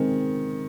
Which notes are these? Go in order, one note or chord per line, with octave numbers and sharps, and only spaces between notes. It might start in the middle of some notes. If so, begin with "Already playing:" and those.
Already playing: D#3 G#3 C4